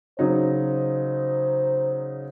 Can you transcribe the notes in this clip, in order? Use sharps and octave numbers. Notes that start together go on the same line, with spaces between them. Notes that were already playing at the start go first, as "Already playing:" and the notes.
C#3 F#3 D#4 C5